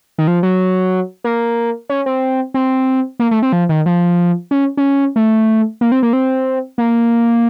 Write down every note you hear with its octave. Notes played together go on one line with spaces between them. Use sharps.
D#3
F3
F#3
A#3
C#4
C4
C4
A#3
A3
C4
F3
D#3
F3
C#4
C#4
A3
A#3
C4
A#3
C4
A#3